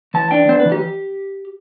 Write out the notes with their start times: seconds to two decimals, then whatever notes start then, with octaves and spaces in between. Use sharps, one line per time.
0.14 E3 A5
0.31 D4 G5
0.48 B3 C5
0.60 B4
0.65 E3
0.72 G4